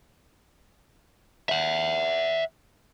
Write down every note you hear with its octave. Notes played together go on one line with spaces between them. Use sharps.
E5 F#5